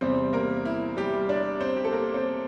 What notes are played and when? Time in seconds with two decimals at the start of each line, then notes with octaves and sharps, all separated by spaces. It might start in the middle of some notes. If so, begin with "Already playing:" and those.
0.01 E2 C3 G3 C4 C5
0.33 A#3 A#4
0.65 E4
0.97 G3 G4
1.29 D4 D5
1.61 C4 C5
1.77 G4
1.85 A4
1.93 A#3 A#4
2.14 C4 C5